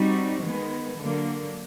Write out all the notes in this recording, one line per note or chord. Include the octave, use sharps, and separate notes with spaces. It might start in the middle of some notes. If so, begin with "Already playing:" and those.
Already playing: G3 C4 D#4 F#4
D#3 G#3 B3
D3 F#3 A#3